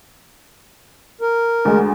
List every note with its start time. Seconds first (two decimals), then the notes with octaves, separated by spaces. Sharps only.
1.21 A#4
1.65 D2 G#3